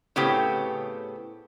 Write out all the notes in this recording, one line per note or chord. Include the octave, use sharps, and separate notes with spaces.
A2 C#3 B3 C4 G4